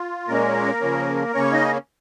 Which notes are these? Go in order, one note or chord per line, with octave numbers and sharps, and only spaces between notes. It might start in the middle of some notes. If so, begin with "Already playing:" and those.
Already playing: F4
A#2 G#3 A#3 C#4 A#4
C#3 F3 C#4
C#3 A#3 C#4 C#5
D#4 D#5